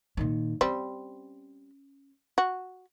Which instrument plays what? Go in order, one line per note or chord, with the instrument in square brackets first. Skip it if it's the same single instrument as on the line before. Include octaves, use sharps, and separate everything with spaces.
[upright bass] A#2 D#3
[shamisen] G3 C4 [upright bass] C#4
[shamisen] F#4